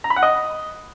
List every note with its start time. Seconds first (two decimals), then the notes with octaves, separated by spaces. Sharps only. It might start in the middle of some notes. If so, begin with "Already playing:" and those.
0.04 A#5
0.10 B5
0.16 F#5
0.23 D#5